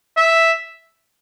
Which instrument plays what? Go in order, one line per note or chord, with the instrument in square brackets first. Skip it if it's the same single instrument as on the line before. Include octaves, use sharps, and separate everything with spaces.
[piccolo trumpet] E5